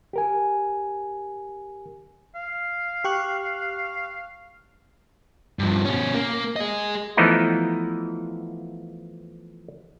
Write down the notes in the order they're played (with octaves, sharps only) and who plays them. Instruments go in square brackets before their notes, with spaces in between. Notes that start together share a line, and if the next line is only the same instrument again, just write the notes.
[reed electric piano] G4 A#4 G#5
[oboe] F5
[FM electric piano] G4 C#6 F#6
[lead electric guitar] G2 F3
B2 C#4
A#3
G#4 D#5
[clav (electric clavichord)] E3 F3 A3 B3 D#4 E4